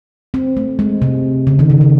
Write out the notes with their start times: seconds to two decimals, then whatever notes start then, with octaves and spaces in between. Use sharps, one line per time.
0.34 C4
0.57 A3
0.79 G#3
1.02 C3
1.47 C#3
1.59 D#3
1.70 C#3
1.81 C#3